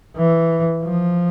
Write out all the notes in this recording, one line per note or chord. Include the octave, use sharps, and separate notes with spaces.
E3
F3